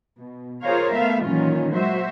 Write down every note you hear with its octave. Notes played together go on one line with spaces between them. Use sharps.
B2
F4 G#4 A#4 C5 C#5 F5
A3 B3 E5 F5
A#2 D#3 E3 F#3 C#4 F4
F#3 G#3 F#4 C5 E5